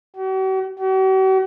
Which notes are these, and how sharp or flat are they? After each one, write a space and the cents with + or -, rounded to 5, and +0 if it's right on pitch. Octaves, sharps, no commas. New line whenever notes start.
F#4 +45
F#4 +45